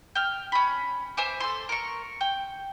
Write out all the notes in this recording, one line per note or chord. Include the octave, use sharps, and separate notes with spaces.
G5 F6
C#4 B5
C5 E5 G#5 D6
A4 C6
A#4 C#6
G5